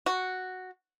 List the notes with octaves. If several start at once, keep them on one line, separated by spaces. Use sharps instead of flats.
F#4